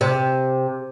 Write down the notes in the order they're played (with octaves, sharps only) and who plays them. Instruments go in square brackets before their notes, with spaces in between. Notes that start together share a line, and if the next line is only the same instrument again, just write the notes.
[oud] C3